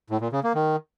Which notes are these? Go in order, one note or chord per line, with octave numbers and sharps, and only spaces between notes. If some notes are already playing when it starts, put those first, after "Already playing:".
A2
A#2
C#3
A#3
D#3